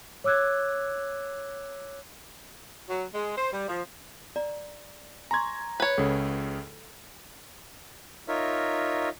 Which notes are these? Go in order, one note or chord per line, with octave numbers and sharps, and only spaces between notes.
C#5 D6 E6 F#6 G#6
F#3
G#3
C5
G3
F3
D5 A#5
G#5 A#5 C6 C#6 G#6
B4 C#5
C#2 C#3 A4 F#5
D#4 F4 A#4 C#5 E5